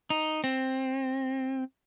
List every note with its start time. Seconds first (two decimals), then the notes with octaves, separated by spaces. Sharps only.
0.10 D#4
0.44 C4